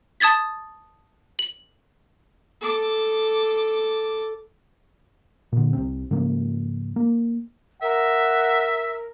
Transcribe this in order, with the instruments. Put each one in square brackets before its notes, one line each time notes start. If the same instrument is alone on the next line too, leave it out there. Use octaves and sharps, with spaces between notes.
[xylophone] A5 D#6 G#6 A6 B6
F#7
[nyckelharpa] A4 D6
[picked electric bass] A#2 D3
C2 C4
G#2 C#3 F3 A#3
A#3
[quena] A#4 [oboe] E5 [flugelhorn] F#5